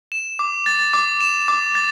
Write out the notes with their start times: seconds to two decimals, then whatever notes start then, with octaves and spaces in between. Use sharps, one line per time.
0.12 E7
0.39 D6
0.66 A6
0.94 D6
1.21 E7
1.48 D6
1.75 A6